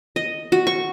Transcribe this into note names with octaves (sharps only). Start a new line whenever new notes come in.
D#5
F#4
C#6